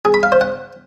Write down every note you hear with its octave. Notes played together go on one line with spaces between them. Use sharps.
G#4
B5
F5
C5
F#5